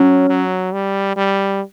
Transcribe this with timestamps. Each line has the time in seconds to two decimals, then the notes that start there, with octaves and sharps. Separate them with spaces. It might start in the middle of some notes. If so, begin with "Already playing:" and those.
Already playing: F#3 C#4
0.30 F#3
0.73 G3
1.16 G3